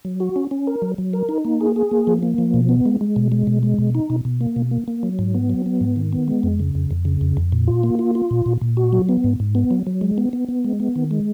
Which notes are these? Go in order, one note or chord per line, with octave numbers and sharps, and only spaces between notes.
F#3
F#4
C#4
C#4
A#4
F#3
F#3
A#4
D#4
A#3
G#4
G#4
A#3
F3
A#3
F3
B2
B3
G#3
G#3
B2
G#3
B2
G#3
B2
D#4
B2
B2
A#3
B2
A#3
A#3
F#3
G#2
B3
F#3
B3
G#2
D#3
B3
G#3
F2
C#3
F2
F2
C#3
F2
F2
A#2
F4
A#3
F4
F4
A#2
A#2
A#2
F#4
F#3
B3
G#2
G#2
B3
F#3
F#3
G#3
B3
B3
B3
G#3
B3
D#3
G#3